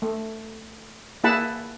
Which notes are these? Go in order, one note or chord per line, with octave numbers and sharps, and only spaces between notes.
A3
A#3 E4 G#4 F#5 A5 B5